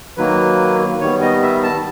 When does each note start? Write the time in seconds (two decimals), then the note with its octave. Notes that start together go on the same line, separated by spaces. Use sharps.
0.17 D#3 F#3 A#3 B4
1.01 D#3 G3 B3 C#5
1.21 D#5
1.42 E5
1.63 A5